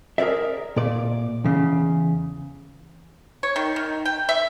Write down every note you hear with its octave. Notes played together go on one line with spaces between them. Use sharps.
G#4 A#4 C#5 D5 E5
A#2 D5
E2 C#3
C#5
D#3
D#3
G5
E5